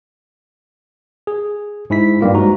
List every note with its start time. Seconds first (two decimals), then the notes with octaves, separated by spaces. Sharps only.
1.27 G#4
1.90 G#2 E4 B6
2.21 G2 G3 A#3 F4
2.34 G#2 F#4 A#5